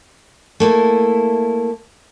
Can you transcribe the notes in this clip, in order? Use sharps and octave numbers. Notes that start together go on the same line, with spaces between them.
A3 A#3 E4